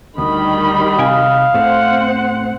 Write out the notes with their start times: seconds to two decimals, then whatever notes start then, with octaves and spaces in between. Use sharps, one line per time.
0.18 D2 D#3 G3 D#5 B5
0.99 C3 F5 G5 G#5
1.54 A2 A3 C4 C5 F#5